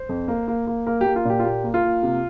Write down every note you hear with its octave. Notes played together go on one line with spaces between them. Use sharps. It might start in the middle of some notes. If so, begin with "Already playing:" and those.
Already playing: C5
F2
A#3
A#3
A#3
A#3 A#4
G4
A#3
F4
A#2 G4
F4
A#3 G4
A#3
F4
A#3
C3